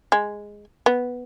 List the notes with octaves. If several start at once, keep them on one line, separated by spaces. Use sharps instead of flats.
G#3
B3